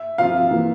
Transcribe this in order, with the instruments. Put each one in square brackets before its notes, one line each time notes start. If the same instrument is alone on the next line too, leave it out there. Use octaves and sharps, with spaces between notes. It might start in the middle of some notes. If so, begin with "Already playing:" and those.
Already playing: [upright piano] E5
[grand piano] F3 C4 F4 [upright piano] F5
[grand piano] E3 A#3 F4